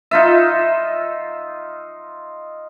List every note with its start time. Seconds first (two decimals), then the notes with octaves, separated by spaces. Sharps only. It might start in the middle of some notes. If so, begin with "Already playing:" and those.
0.11 D#4 F4 E5